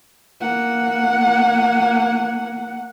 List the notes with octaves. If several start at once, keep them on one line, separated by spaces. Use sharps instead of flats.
A#3 F#5